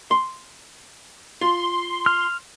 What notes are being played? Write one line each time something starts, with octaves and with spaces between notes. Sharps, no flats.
C6
F4 C6
F6